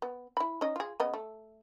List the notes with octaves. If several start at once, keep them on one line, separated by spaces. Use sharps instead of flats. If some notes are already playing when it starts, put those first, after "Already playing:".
B3
E4 B5
C#4 D#4 D#5
F4 G#4
C#3 B3 D#5
A3